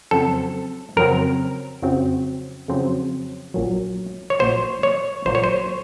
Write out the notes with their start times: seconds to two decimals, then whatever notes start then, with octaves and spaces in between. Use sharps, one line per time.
0.11 F2 C#3 F#3 C4 A4
0.96 F2 C#3 F#3 C4 A#4
1.82 F2 C#3 F#3 C4
2.68 F2 C#3 F#3 C4
3.54 A#1 A#2 F#3
4.30 C#5
4.39 A#1 A#2 F#3 C5
4.83 C#5
5.25 A#1 A#2 F#3 C5
5.35 C#5
5.44 C5